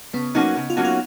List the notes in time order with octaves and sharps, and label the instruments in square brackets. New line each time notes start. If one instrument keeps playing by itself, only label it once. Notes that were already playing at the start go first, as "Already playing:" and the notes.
[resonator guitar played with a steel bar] C#3 [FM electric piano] B3
[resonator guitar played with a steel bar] F#3 A#3 C#4 F#4 [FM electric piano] D#4
[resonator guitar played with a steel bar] C#3
[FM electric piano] F4
[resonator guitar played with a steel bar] F#3 A#3 C#4 F#4
[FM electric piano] F4